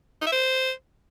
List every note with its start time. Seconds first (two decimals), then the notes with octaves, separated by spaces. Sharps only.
0.21 D#4
0.27 E5
0.32 C5